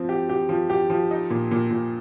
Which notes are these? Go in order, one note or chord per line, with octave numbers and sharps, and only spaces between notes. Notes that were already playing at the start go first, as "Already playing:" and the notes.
Already playing: F3 C4
G4
G4
F3
G4
F3
D#4
A#2
A#2
A#2